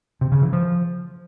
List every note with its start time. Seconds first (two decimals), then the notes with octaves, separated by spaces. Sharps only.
0.21 C3
0.32 C#3
0.42 E3
0.53 F3